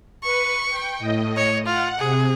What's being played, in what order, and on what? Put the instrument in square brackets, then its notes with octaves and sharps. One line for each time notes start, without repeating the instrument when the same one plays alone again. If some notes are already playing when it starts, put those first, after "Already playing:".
[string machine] B4 [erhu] C#6
[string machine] G5
A2 D#5
[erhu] C#5
[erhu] F4 [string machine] F#5
[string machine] C3 [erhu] G#4